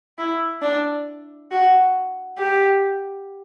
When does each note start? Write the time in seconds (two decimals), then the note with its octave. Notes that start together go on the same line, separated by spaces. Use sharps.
0.18 E4
0.62 D4
1.51 F#4
2.38 G4